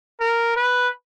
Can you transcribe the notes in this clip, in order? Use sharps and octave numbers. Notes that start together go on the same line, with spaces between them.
A#4
B4